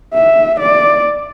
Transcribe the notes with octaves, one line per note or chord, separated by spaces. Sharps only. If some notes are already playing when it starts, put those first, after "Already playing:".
E5
D5